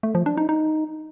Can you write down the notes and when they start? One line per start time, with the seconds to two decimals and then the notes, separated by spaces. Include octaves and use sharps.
0.03 A3
0.15 F3
0.26 D4
0.37 D#4
0.49 D#4